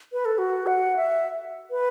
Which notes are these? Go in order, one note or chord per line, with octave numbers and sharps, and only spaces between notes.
B4
A4
F#4
F#5
E5
B4